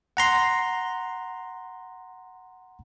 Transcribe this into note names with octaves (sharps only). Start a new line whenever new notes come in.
F#5 A#5 C6